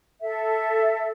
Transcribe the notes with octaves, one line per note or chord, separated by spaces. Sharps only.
A4 E5